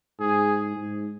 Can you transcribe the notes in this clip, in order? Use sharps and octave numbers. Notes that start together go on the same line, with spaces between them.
G#2 G#4
G#2